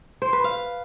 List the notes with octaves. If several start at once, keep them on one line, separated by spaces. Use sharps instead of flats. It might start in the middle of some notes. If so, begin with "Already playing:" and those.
C5
B4
F5